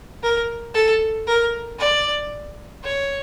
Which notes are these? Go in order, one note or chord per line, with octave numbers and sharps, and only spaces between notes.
A#4
A4
A#4
D5
C#5